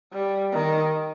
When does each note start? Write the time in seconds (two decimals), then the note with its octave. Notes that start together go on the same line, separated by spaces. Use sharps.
0.12 G3
0.53 D#3